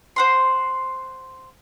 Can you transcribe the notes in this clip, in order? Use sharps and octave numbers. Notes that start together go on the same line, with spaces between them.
C5 F#5 C6